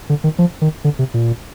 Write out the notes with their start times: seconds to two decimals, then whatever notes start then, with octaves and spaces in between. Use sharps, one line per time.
0.09 D3
0.24 D#3
0.39 F3
0.62 D#3
0.84 D3
0.99 C3
1.14 A#2